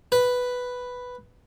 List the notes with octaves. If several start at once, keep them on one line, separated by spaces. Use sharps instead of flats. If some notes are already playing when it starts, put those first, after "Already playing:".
B4